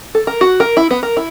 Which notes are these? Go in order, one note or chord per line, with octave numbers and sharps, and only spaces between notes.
A4
A#4
F#4
A#4
E4
B3
A#4
E4